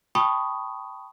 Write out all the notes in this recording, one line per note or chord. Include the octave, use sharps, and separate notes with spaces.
G5 A5 B5 C#6 D#6